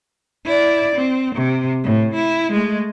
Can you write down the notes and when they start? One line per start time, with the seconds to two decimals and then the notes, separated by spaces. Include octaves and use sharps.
0.45 E4 D5
0.96 C4
1.35 C3
1.84 A2
2.15 E4
2.52 G#3 A3